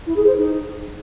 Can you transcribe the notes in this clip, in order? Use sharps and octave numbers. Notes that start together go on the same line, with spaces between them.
E4
G#4
C5
D#4